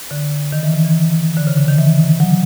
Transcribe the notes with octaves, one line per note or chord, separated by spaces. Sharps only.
D3
D#3
E3
E3
E3
D3
C#3
D3
D#3
E3
F#3